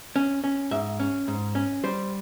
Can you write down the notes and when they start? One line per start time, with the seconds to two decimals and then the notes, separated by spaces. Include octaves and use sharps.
0.16 C#4
0.44 C#4
0.71 G#2 E5
1.00 C#4
1.28 G#2
1.55 C#4
1.84 G3 C5